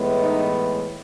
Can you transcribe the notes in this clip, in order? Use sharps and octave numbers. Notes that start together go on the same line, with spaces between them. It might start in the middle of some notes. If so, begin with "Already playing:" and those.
Already playing: A2 E3 G#3 B3
D#4